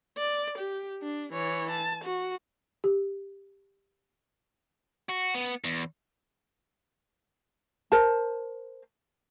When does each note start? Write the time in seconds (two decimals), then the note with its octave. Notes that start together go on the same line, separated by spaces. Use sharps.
0.18 D5
0.58 G4
1.02 D4
1.33 E3 C#5
1.71 A5
2.05 F#4
2.84 G4
5.09 F#4
5.35 B3
5.64 E2
7.92 A#4 C5 A5